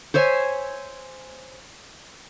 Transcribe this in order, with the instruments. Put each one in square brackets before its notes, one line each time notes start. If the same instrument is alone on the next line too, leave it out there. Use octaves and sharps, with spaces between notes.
[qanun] C5 C#5 E5 G#5